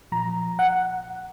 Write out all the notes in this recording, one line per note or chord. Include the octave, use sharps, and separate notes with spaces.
A#2 F3 A#5
F#5